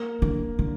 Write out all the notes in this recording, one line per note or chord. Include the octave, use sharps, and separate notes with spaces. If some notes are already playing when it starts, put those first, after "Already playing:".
Already playing: A#3
D3
D3